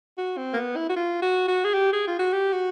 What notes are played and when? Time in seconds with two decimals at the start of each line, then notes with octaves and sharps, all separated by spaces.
0.18 F#4
0.37 C4
0.53 A#3
0.57 B3
0.76 E4
0.89 F#4
0.96 F4
1.22 F#4
1.48 F#4
1.64 G#4
1.74 G4
1.93 G#4
2.07 F4
2.19 F#4
2.32 G4
2.52 F#4